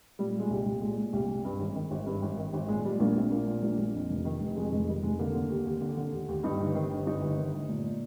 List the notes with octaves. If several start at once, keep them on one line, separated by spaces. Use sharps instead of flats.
A#2 G3
A#2
G#3
C2
C2
A#2 G#3
A#2
C2
C2
G2
G#1
D#3
G#1
G2
G#1
D#3
G#1
A#2 G#3
A#2 G3
A#1 A#3
A#1 C4
A#2 A#3
A#2
A#1
A#1
F2
F1
D#3
F1
F2 G#3
F1 G#3
D#3 G3
F1 G#3
D3 A#3
D3
D#2
D#2
D3
D3
D#2
D#2
G2 D#4
G1
D#3
G1
G2 D#4
G1
D#3
G1
A#2
A#2